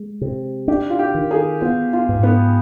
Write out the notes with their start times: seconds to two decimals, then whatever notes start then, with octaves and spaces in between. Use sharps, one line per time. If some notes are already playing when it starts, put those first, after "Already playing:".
Already playing: G#3
0.21 C3
0.68 D4 G4
0.90 F4
0.99 G4
1.14 D#3
1.31 G#4
1.61 B3 F4
1.93 F4
2.09 G#2
2.23 B3